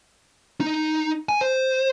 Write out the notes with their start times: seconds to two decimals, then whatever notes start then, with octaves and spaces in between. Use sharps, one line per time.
0.60 D#4
1.29 G#5
1.41 C5